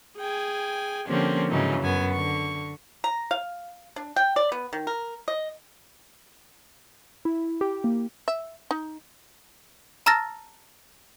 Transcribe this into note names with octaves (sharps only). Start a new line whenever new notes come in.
G#4 G5 G#5
D3 F3 A#3 C4 C#4 G4
G#2 C#3 E3 F#3 D#4
F#2 B3 G#5
D3 C#6
A#5
F5
D4
G5
D5
B3
D#3
A#4
D#5
E4
G4
A#3
E5
D#4
A5 A#5 E6 F6 A6 A#6